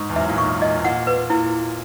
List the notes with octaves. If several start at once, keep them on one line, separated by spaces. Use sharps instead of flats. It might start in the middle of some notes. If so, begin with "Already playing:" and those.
Already playing: G#2 C#6
E2
F#2 E5
A#2
G#2 C#6
A#2 D#5
G#2
A#2 F#5
B4
A#2 E4